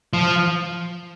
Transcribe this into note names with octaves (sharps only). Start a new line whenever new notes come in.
F3